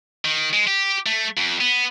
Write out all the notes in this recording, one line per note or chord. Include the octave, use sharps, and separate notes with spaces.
D#3
G#3
G4
A3
F2
B3